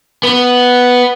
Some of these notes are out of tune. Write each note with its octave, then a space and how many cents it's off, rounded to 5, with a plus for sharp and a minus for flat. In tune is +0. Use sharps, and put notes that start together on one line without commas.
B3 +0